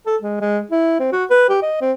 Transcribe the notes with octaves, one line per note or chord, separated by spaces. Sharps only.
A4
G#3
G#3
E4
C4
F#4
B4
G4
D#5
C4